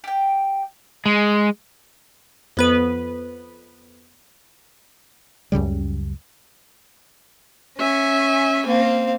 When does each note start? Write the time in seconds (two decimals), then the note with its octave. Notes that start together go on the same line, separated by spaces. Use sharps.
0.04 G4 G5
1.06 G#3
2.57 F2 B3 B4
5.52 C#2 F#2 C#3 G3
7.78 C#4 E5 G#5 C#6
8.67 A#3 C4 F5